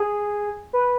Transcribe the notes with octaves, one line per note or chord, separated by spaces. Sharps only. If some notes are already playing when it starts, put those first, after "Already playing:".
Already playing: G#4
B4